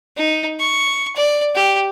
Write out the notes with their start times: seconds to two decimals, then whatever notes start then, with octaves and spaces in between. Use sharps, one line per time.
0.17 D#4
0.60 C#6
1.16 D5
1.55 G4